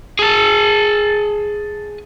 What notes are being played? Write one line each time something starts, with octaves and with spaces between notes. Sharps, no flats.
G#4 A5